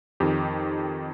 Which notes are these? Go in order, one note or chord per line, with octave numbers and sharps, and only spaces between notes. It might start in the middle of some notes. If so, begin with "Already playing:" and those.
F2 D#3 G4